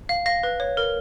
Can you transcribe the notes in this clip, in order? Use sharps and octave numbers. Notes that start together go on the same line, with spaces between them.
F5
F5 A#6
B4
C#5
A#4